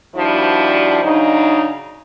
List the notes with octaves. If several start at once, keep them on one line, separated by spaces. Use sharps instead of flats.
D#2 F3 G3 D4 E4 F#4
C#3 F#3 D4 D#4